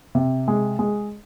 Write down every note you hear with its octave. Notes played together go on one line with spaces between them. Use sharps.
C3
G#3
G#3